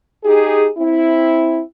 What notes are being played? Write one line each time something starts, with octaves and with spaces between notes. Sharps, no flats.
D#4 G4 G#4
C4 E4